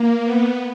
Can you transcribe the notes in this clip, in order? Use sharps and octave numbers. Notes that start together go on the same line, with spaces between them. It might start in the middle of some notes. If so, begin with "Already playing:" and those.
Already playing: A#3
B3